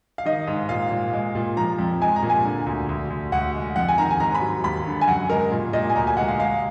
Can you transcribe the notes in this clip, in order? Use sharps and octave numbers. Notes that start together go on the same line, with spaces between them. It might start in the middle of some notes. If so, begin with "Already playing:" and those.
F5
D#3 D#5
G#2
A#2 F5
A#2
G#3
A#2
F3 A#5
F2
G#3 G#5
A#5
A#2
G#5
D3
D2
D2
D2
D2 F#5
G#3
F2 F#5
G#5
D#3 A#5
G#5
G#2 A#5
B5
F#3
D#2 B5
D3
G#5
F#2 F#5
G#3 A#4
A#2
A#2 D#5
G#5
D2 A#5
G#5
G#3 F#5
F5
G#3 F5